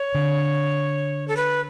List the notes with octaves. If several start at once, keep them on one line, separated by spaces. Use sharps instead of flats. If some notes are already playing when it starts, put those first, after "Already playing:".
Already playing: C#5
D3
A4
B4